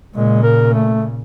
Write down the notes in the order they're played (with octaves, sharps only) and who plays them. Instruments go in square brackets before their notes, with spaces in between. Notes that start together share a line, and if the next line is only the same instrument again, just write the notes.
[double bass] A#2 C#3 [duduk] G#3
[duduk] A#4
A3